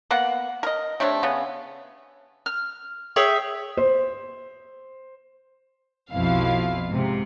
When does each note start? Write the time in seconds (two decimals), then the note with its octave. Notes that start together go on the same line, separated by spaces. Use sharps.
0.11 A#3 B3 F#5
0.63 A#4 D#5
1.00 C3 A3 D4 C#5
1.23 C#3 B3
2.46 F6
3.16 G#4 C#5 E5 G5
3.77 C5
6.12 B1 F2 B2 F3 E4 F5
6.89 G#2 C3